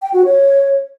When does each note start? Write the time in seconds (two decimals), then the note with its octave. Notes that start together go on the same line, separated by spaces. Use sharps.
0.02 G5
0.14 F#4
0.25 C#5